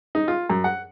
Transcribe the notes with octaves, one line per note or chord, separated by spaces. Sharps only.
D#4
F4
F#2
F#5